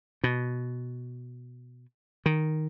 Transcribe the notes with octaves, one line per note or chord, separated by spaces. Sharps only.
B2
D#3